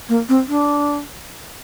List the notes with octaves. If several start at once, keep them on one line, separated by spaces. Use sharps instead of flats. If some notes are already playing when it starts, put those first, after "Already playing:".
A#3
C4
D4